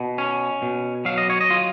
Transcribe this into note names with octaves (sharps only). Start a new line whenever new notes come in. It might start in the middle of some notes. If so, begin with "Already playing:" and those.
Already playing: B2
C#4
B2
F#3 F5
D#5
C#5
D#5
F4